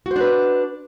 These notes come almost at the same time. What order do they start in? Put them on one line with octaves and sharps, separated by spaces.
F#4 C5 D4 B4